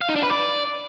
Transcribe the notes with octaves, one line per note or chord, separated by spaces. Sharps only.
F5
D#4
D4
B4
D5